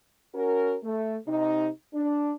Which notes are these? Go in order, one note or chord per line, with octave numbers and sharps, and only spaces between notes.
C#4 F#4 A#4
A3
C3 D#4
D4